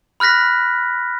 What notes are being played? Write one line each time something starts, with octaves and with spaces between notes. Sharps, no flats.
B5 F6 F#6 A#6 B6